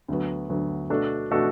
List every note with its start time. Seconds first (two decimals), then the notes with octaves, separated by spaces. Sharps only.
0.08 D2 D3 F#3 B3
0.50 D2 D3 F#3 B3
0.90 B2 A3 D4 F#4 A4
1.31 B2 A3 D4 F#4 A4